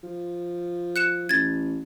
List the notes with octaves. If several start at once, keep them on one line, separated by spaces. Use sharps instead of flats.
F3
F#6 C#7 E7
A1 G#6 A6